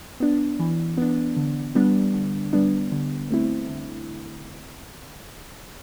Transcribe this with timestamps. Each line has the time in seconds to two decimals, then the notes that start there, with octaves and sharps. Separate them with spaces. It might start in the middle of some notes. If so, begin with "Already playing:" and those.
0.20 B3 D4
0.60 E3
0.97 B3 D4
1.37 D3
1.75 G3 B3 D4
2.14 D3
2.53 G3 B3 D4
2.92 D3
3.31 A3 C4 E4
3.69 D3